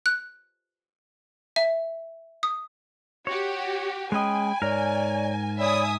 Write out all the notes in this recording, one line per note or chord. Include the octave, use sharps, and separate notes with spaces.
F#6
E5
D#6
F#4 G4 C#5
G#3 C#4 D#5 G5 G#5 B5
G#2 A#4 C#5 D5
C#5 D5 E5 G#5 B5 D#6